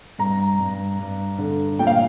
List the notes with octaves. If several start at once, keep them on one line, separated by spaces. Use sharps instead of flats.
G2 A#5
G2
G2
D3
A#2 G5
F5